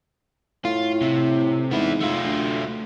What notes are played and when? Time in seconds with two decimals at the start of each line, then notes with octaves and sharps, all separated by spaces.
0.65 A2 F4
1.02 C3
1.71 G#2 B3 E4
2.01 A3 F4
2.25 D2